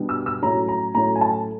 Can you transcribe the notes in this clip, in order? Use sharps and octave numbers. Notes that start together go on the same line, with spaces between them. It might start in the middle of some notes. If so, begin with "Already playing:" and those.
Already playing: B2 G3 B3 D4
E6
E6
A2 F#3 A3 C#4 A#5
A#5
A2 F#3 A3 C#4 A#5
G#5
A5